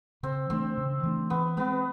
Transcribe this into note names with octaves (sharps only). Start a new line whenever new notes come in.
C#3 C4
E3 A3 C4 D4
C#3
E3 A3 D4
E3 B3
G#3 B3 C4